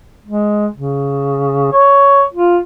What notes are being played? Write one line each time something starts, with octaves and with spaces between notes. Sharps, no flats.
G#3
C#3
C#5
F4